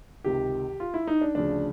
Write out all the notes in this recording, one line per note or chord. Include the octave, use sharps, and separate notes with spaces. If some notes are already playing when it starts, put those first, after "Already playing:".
C#2 C3 D#3 G4
F4
E4
D#4
D4
D2 C#3 F3 D4